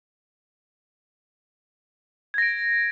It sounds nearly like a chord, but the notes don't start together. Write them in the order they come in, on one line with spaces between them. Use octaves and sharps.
G#6 A#6 D7